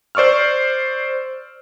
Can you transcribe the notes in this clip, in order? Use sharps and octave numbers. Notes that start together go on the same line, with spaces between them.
C5 D5 C#6 E6 F6